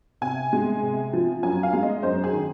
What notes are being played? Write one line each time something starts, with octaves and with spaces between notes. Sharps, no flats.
C3 G#5
G#3
C3
F3
F#2 G#5
F5
G#3
D#5
F#2 C5
G#4
D#3